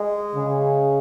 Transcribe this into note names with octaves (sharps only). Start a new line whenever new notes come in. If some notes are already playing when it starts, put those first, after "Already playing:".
Already playing: G#3
C#3